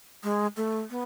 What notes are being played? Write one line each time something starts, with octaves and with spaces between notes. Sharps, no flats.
G#3
A3
B3